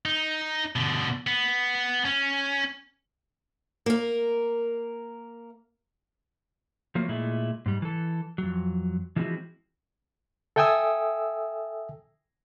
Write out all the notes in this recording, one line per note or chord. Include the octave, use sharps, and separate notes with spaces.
D#4
B2 D3
B3
C#4
A#3 A#4
F3 F#3 A3 A#3
A#2 G#3 A3 E4
G#2 G3
E3 A4
F2 F#3
E3 F3 G#3 C4 E4 F#4
A4 E5 G5 G#5 D#6 E6